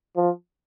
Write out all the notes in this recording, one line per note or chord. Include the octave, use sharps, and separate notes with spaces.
F3